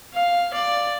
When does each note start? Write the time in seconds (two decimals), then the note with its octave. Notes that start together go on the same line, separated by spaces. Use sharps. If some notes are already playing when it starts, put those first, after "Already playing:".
0.14 F5
0.53 D5